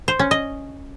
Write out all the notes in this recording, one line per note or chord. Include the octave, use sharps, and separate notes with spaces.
C5
C#4
D#5